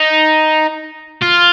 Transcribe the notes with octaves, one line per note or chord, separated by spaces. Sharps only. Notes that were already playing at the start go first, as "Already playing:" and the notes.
Already playing: D#4
F4